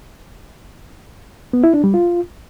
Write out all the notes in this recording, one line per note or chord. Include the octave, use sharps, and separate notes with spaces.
B3
E4
D4
G3
F4